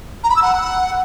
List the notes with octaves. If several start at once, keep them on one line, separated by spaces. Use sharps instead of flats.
A#5
B5
E6
F#5